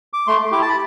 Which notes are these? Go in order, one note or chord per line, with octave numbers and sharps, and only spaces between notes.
D6
A3 C6
E4 G4 D6
A5
B5